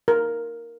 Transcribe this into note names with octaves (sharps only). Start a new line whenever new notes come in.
A#4